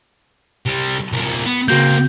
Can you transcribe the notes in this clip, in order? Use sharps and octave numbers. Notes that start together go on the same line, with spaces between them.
C3 G3
C2 A#2
B3
C#3 A#3 C4 F#4 G6